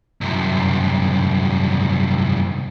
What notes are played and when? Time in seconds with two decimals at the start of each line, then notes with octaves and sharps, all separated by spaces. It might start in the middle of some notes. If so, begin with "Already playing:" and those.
0.21 C2 F#2